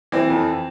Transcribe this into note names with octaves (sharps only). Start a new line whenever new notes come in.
E3 C4
F2